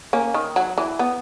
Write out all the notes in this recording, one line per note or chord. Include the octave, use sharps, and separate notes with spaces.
A#3 C#4
D#3
F#3
E3
B3